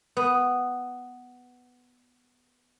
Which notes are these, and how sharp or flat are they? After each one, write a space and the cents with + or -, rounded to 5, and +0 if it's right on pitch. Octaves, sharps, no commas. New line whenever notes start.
B3 +5